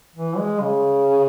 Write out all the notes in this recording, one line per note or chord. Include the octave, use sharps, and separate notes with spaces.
E3
G#3
C#3